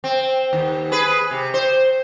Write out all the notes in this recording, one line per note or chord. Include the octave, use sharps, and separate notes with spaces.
C4
D#2
G#4 B4
C3
C5